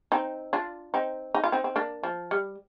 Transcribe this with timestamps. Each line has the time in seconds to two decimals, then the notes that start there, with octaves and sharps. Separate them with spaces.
0.12 C4 D#4
0.53 D4 F4
0.94 C4 D#4
1.34 D#4
1.44 F4
1.52 C4 D#4
1.64 C4
1.76 A#3 D4
2.03 F3
2.31 G3